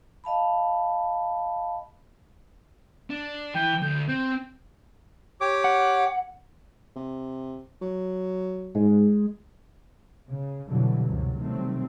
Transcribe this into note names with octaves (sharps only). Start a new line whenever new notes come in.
D#5 F5 A5 B5
D4
E3 G5
D2 G6
C4 G6
G4 C#5 D6
F#5
C3
F#3
G#2 G#3
C#3
F2 B2 D3 E3 F#3 G3
C#2 F#2 C3 F#3
C3 D#3 F#3 G3 A3 C4